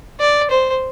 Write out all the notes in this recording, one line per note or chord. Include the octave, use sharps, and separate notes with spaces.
D5
C5